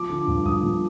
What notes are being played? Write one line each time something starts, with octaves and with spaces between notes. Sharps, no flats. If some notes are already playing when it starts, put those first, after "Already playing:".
Already playing: F3 D6
D3
G2
G2 D#6
F3